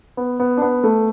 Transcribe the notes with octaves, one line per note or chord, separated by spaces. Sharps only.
B3
B3
D4
B3
A3